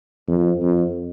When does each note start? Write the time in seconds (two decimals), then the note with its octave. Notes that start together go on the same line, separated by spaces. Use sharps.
0.28 F2
0.62 F2